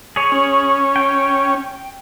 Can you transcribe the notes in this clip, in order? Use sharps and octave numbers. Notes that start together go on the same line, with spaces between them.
G#4 C#5
C#4
G5